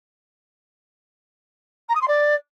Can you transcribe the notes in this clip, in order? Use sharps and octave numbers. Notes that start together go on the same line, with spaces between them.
A#5
D#6
C6
D5